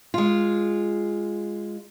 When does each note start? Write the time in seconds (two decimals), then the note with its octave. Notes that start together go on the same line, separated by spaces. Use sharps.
0.14 G#3 F4